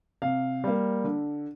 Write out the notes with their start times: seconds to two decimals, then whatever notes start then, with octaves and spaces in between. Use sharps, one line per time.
0.22 C3 F5
0.64 G3 A#3
1.04 D3